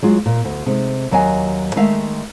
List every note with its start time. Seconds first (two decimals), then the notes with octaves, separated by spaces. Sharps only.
0.03 F#3 G#3 F4
0.26 A#2
0.45 D2
0.66 C3 G#3 D#4
1.11 D#2 F#3 D#5 F5 G#5
1.76 D#3 G#3 A3 E5 F5